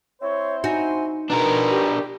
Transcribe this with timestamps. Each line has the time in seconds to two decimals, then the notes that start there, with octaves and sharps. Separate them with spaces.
0.21 C4 E4 C5 C#5
0.64 D#4 F#4 G#5
1.30 B2 D4 A#4 A#5
1.71 G4